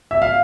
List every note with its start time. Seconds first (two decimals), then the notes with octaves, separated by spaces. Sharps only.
0.11 E5
0.22 F5